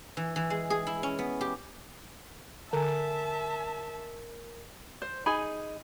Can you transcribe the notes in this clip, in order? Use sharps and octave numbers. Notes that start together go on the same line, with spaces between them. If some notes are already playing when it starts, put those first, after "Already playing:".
E3
E3
G#3
G#4
E4
C#4
B3
G4
D3 A#4 E5 G#5 A5
C5
D#4 G#4 G#5 B5